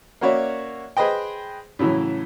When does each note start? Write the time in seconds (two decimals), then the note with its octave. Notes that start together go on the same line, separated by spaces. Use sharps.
0.21 A#3 C#4 F#4 C#5 D5 E5
0.97 G#4 B4 C5 D#5 G5
1.79 A2 C#3 E3 F#3